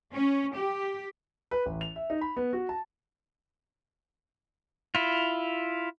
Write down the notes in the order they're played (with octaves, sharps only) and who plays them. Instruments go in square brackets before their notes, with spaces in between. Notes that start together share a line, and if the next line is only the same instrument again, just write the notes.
[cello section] C#4
G4
[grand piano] B4
A1
F7
E5
D#4
B5
B3
F#4
A5
[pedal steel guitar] E4 F4